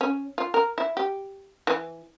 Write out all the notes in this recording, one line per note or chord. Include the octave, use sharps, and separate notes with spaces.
C#4
F4
A#4
E4
G4
E3